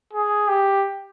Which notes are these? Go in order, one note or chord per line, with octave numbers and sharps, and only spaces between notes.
G#4
G4